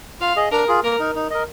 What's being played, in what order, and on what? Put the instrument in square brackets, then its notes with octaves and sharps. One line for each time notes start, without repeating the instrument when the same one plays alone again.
[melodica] F4 [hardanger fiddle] F5
[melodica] G#4 D#5
[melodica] D4 [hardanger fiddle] A#4
[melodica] F4 G#4
[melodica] A#3 [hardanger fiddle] A#4
[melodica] D#4 A#4
D#4
A#4 D#5